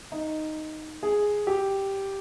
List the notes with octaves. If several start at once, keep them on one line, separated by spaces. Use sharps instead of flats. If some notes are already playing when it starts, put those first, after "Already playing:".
D#4
G#4
G4